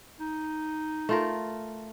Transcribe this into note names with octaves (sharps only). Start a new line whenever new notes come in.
D#4
A3 F4 A#4